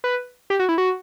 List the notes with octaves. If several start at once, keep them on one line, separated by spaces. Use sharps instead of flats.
B4
G4
F#4
E4
F#4